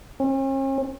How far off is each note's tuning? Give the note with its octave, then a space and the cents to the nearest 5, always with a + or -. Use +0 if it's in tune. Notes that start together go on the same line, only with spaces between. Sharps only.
C#4 -45